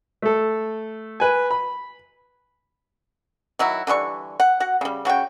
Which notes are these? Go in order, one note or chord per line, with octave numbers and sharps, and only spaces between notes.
A3 A4
B4 G#5
B5
D#3 F#3 E4 F#4
D3 E3 G3 C#6
F#5
F#4 F#5
C#3 G3
C#3 F#4 C#5 G5